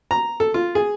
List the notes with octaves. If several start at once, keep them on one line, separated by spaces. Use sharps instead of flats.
A#5
A4
F4
G#4